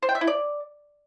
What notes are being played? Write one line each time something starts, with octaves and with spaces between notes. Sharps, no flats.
C5
G5
E5
E4
D5